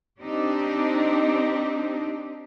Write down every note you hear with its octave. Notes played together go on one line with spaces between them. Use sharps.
C4 D4 D#4 G4